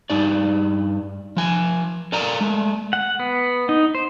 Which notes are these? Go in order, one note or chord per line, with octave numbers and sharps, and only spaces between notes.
G2 D#4 D5
F3 G#5
A4 A#4 D5 F5 A#5
G#3 A3
F#5
B3
D#4
C5